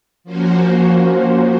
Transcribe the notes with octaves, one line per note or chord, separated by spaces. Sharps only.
F3 A#3 C#4 F#4 C5